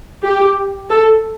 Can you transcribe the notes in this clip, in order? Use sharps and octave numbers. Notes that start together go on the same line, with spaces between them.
G4
A4